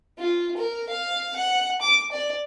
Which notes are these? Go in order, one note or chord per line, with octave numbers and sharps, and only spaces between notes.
F4
A#4
F5
F#5
D6
D5